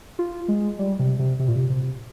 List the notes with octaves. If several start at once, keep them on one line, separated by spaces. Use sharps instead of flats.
F4
G#3
G3
C3
C3
C3
A#2
C3
C3